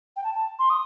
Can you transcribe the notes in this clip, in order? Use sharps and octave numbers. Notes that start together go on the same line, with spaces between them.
G5
A5
A5
C6
D#6